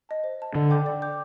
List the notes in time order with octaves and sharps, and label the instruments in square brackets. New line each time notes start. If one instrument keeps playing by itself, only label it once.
[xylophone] D#5 A5
C5
D#5 A5
[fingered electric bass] D3 [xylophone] D5
[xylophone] G5 D6 G6
D5
G5 D6 G6